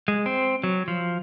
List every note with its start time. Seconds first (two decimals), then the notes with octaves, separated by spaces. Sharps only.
0.08 G#3
0.26 C4
0.64 F#3
0.88 F3